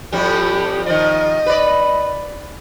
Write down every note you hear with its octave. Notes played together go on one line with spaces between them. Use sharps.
F2 A2 G3 G4
D#3 F3 D#5
B4 D5